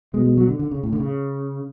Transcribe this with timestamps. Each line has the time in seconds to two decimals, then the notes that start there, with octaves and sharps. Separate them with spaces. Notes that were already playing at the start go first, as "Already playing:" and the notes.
0.14 B2 G#3
0.26 G#3
0.38 F#3
0.48 D3
0.59 D3
0.71 C#3
0.83 A2
0.93 D3
1.00 C#3